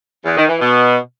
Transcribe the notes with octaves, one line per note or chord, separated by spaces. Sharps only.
E2
D#3
E3
B2